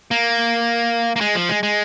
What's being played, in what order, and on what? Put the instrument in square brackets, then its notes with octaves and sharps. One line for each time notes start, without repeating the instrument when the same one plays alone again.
[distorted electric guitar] A#3
A#3
G#3
F3
G#3
G#3